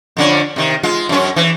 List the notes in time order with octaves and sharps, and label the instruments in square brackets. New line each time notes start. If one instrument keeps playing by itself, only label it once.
[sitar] F2 D3 C#4
C3 D#3
G#3 F4
F#2 C#4
E3